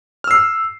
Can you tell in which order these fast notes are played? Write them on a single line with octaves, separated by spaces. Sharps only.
F6 E6 C7